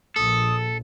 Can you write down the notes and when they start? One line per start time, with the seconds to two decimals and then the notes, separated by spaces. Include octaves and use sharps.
0.16 A#1 A4 D#6